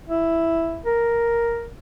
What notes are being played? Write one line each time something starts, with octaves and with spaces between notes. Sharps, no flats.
E4
A#4